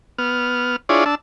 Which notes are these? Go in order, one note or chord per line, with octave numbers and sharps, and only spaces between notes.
B3 F6
D4 E4 F4 G#4 C#5 D5
D4 A5 E6